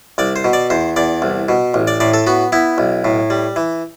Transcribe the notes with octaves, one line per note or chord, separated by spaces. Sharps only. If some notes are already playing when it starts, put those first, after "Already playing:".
C2 D5
C5
B2
D5
E2 C5
E2 D5
C2
B2
A1
D5
A2 D5
A4
B3 F#4
B3 E4
B1
A2
G3
E3